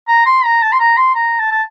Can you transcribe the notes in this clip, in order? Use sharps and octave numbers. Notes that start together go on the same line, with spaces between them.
A#5
C6
A#5
A5
C6
A#5
C6
A#5
A5
A5